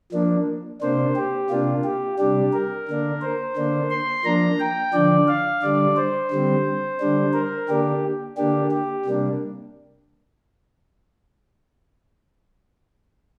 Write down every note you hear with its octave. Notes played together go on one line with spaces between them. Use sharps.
F3 A#3 D4
C3 A#3 D4 C5
G4
C3 A#3 D4 F4
G4
C3 G3 D4 G4
A#4
D3 A#3 D4
C5
D3 A#3 D4
C6
F3 A#3 D4 A#5
G5
D3 F3 D4 D5
F5
D3 G3 D4 D5
C5
D3 G3 C4
D3 G3 D4
A#4
D3 A#3 D4 G4
D3 A#3 D4 G4
G4
C3 G3 A#3 D4